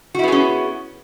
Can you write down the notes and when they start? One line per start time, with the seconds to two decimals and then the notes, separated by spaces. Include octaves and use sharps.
0.15 F#4
0.19 E4
0.23 B3
0.28 G#4
0.32 C#4